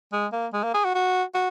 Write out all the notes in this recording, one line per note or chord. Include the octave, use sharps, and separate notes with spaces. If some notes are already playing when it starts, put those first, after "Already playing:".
G#3
A#3
G#3
A#3
G#4
F#4
F#4
F#4